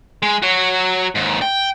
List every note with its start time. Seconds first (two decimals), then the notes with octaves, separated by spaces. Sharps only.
0.23 G#3
0.42 F#4 C#5
1.15 D#2 G#2
1.42 G5